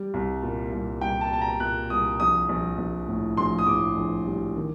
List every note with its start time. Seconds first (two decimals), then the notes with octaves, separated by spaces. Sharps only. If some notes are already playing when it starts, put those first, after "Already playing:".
Already playing: G3
0.14 C2
0.43 A#2
0.72 C2
1.01 C2 G5
1.21 A5
1.31 A#2 A5
1.41 A#5
1.60 A#2 F#6
1.90 C2 D#6
2.20 A#1 D#6
2.49 A#1
2.78 A#1
3.08 A2
3.37 A#1 C6
3.58 D#6
3.67 A2 D6
3.97 A#1
4.26 G3
4.56 D#3